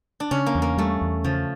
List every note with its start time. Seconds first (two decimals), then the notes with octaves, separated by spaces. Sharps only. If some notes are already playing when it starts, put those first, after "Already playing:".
0.20 D4
0.31 C#3 C#4
0.46 A#3
0.55 E2
0.62 A#3
0.77 G3 A3
1.01 E2
1.24 C#3 F3